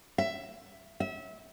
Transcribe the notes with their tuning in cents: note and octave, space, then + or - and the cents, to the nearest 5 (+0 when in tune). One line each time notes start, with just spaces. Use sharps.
E5 +10
E5 -25